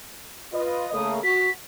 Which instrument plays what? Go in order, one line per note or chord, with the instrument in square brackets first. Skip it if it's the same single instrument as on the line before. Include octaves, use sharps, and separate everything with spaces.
[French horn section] F4 B4 D#5
[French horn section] C#3 A3 A#3 [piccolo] D#6
[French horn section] F#4 [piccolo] B6